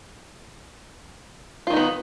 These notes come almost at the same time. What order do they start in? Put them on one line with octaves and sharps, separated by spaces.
F4 D#3 D#4 B3